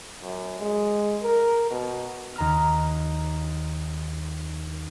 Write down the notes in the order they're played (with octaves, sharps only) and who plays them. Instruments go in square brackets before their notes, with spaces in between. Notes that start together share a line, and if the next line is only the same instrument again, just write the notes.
[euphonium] F#2
G#3
A#4
B2
[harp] D#2 A#5 F6